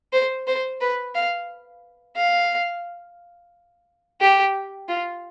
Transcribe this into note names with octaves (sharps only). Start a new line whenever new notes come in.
C5
C5
B4
F5
F5
G4
F4